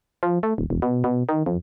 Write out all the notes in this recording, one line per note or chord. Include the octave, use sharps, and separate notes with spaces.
F3
A3
D#1
E1
B2
B2
D#3
F2